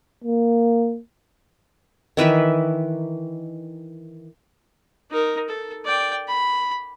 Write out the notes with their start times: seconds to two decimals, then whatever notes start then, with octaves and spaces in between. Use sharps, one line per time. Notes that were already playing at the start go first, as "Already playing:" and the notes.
0.24 A#3
2.17 D#3 E3 B4 E5
5.11 D#4 A#4
5.49 A4
5.85 D5 G5
6.28 B5